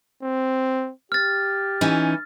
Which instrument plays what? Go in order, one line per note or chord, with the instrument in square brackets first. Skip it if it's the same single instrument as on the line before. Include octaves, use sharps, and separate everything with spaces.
[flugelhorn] C4
[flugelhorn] G4 [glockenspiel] F6 A6
[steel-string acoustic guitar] E3 C#4 D#4